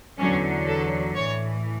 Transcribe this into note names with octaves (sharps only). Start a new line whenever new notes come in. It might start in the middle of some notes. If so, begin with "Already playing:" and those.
E2 D3 F#3 C#4
A4
A2 E3 C#5